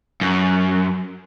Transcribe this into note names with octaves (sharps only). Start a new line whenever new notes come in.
F#2